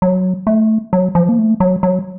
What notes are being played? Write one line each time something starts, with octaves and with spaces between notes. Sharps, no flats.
F#3
A3
F#3
F3
A#3
A3
F#3
F#3